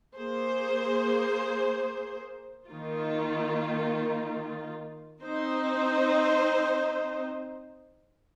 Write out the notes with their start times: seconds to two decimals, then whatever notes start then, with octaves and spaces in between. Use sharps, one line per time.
0.16 A#3 G#4 C5
2.69 D#3 A#3 F4
5.23 C4 D#4 C5